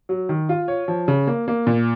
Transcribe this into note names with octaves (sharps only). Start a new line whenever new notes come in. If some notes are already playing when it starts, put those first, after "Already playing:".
F#3
D#3
F4
C#5
F3
C#3
A#3
A#3
A#2